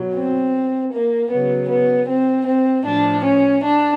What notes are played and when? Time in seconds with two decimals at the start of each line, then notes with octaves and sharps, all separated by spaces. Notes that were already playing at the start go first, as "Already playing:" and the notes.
Already playing: B2 F#3
0.15 C4
0.93 A#3
1.31 C#3 F#3 B3
1.69 B3
2.08 C4
2.46 C4
2.85 A2 F3 D4
3.24 C#4
3.62 D4